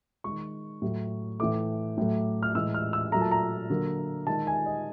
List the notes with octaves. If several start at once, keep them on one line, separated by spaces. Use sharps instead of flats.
D#3 G#3 C#6
A2 F#3 A3
A2 E3 A3 D6
A2 F#3 A3
F6
A2 E3 G#3 E6
F6
E6
A#2 F#3 A3 A#5
A5
A#5
D3 F#3 A#3
D#3 G#3 A5
G#5
D#5